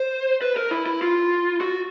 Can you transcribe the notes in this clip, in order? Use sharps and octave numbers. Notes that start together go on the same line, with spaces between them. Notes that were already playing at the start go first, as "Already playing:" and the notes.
Already playing: C5
B4
A#4
E4
E4
F4
F#4